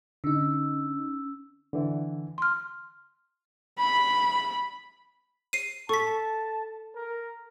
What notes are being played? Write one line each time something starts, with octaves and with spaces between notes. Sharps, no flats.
D3 C#4 D#4 E6
D3 E3
C6 F6
B5
C7 D#7
A4 A5 C#6 B6
A#4